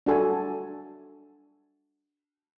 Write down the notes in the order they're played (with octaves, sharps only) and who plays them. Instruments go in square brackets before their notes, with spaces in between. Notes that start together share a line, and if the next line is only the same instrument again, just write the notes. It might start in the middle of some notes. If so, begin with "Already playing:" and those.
[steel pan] D4 F#4 A4 G#5